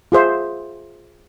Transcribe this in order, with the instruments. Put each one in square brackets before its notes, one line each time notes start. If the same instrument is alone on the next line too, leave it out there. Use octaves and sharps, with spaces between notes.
[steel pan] F4 G#4 C5 E5